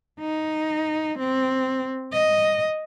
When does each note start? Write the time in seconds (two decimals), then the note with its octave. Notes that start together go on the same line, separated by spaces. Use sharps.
0.20 D#4
1.19 C4
2.12 D#5